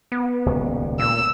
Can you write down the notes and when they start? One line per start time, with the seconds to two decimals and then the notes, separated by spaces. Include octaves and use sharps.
0.12 B3
0.46 D#1 C#2 B2
1.00 A#2 E6